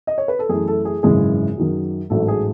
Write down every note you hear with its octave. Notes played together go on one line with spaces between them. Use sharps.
D#5
C#5
B4
A4
F#2 E3 A3 G#4
A4
G#4
G#1 F#2 C#3 E3 G#3 G#4
F#2 D#3 F#3
A1 G#2 F#3 A3 A4
G#4